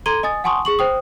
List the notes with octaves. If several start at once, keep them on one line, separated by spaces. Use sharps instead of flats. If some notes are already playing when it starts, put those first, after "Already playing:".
A4 A#5 C6 G#6 D#7 G7
D#5 G#5 D#6 A6
F#5 G#5 A5 C6 C#6 D#6
G#4 C#6 F#7
C5 G5 D#6